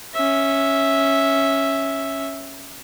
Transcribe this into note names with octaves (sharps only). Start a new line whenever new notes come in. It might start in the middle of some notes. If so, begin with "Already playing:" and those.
C#4 E5